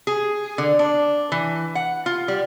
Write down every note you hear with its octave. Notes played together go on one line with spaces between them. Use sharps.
G#4
D3
D4
E3
F#5
F4
G3